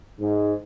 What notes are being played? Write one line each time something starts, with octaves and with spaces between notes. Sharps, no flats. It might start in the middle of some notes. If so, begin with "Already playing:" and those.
G#2